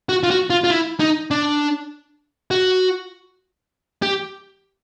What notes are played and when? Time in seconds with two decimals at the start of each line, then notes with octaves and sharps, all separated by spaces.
0.09 F#4
0.23 F4
0.30 F#4
0.50 F4
0.64 F4
0.70 E4
1.00 D#4
1.31 D4
2.51 F#4
4.02 G4